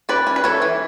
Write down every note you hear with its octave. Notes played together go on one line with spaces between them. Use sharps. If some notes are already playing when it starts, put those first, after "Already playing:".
C#4 B4 D5
C#4
B4
E3 A4 C#5
E3